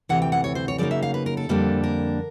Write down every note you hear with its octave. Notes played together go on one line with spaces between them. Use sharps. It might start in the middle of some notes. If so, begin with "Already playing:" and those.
D2 C3 E3 F#5
G5
F#5
C#5
C5
C#5
C#3 F#3 A#3 D#4 D5
E5
F5
B4
A#4
A4
F2 D3 G3 A#3 D4
A#4